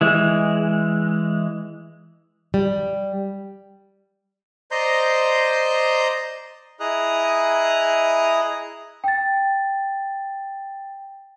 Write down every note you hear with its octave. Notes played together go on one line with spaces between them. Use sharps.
E3 G#3
G3
C5 D5 D#5 A#5 C6 G6
E4 G#4 D#5 A#5 D#6 F#6
G5 A6